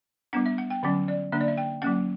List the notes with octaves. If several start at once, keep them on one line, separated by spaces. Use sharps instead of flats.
G3 B3 D4 F#5
E5
F#5
G5
D3 F#3 C#4 F#5
D5
D3 A#3 D4 E5
D5
E5
G5
F#3 A#3 C#4 F#5